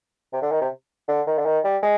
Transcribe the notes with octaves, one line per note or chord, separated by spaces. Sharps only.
C3
D3
D#3
C3
D3
D#3
D3
D#3
G3
G#3